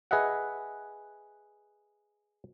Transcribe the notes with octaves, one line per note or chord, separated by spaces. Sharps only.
G#4 B4 D#5 E5 F#5